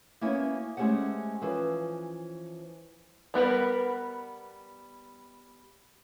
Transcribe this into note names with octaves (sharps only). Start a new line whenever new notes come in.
A#3 B3 C#4 E4 F#4
G#3 A3 C#4 G4 C5 F#5
E3 F3 C#4 E4 B4 C5
G3 B3 A#4 B4